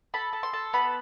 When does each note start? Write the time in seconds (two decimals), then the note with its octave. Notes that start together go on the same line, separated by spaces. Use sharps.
0.14 A4 B5
0.33 A4
0.43 C6
0.53 A4
0.73 B3 B5